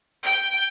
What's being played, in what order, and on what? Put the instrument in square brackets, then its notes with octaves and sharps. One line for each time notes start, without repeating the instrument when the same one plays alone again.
[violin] G5